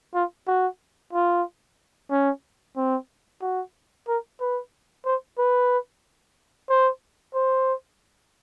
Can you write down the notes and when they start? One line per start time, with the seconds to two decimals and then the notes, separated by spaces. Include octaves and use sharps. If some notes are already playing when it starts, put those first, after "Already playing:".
0.15 F4
0.47 F#4
1.13 F4
2.11 C#4
2.77 C4
3.42 F#4
4.08 A#4
4.40 B4
5.06 C5
5.39 B4
6.70 C5
7.34 C5